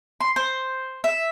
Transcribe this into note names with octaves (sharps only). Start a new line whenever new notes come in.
C6
C5
E5